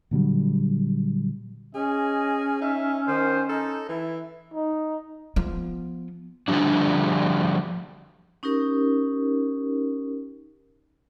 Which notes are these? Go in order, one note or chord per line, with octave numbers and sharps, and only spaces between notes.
A#2 D3 F#3 G3
C#4 G#4 D#5
D#4 E5
D#3 C5
D#4 A4
E3 E4
D#4
F3 B3
D3 F3 G3 D4
C#4 D#4 G4 A#4